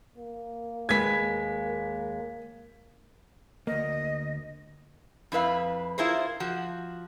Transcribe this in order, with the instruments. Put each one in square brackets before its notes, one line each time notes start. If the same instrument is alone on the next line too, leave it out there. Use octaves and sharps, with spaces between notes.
[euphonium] A#3
[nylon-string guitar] D#2 G#3 B4 [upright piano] G#6 B6
[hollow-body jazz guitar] D2 A#3 [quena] D#5
[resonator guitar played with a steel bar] F2 E4 B4 F5
E4 F4 G#4 A#4 C5
F3 F#4